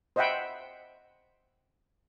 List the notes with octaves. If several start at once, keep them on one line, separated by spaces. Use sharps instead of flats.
C5 D#5 E5 F#5 G5 B5